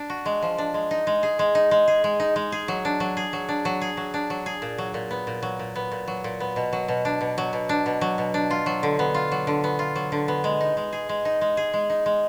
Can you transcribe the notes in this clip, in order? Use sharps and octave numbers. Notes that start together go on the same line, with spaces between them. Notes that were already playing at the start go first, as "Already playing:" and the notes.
Already playing: D4
F#4
G#3
F3
D4
G#3
D#4
G#3
G#4
G#3
D#4
G#3
G#4
G#3
D#4
G#3
G#4
F#3
D4
F#3
G#4
F#3
D4
F#3
G#4
F#3
D4
F#3
G#4
A#2
F#3
A#2
B3
A#2
F#3
A#2
B3
A#2
F#3
A#2
B3
B2
F#3
B2
D4
B2
F#3
B2
D4
B2
F#3
B2
D4
F4
F#3
D3
B3
F4
F#3
D3
B3
F4
F#3
D3
B3
G#3
D#4
G#3
G#4
G#3
D#4
G#3
G#4
G#3
D#4
G#3